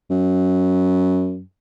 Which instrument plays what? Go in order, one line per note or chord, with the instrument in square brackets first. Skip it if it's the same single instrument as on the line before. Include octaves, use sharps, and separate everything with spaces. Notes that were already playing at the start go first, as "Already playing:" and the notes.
[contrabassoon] F#2